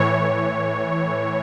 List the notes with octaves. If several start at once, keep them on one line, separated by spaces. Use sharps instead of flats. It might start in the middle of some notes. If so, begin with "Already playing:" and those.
Already playing: A2 E3 C#5